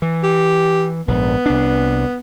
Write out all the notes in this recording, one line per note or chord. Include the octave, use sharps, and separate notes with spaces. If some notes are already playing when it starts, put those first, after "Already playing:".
E3
G4
A#1 G#2 B3
C2 D4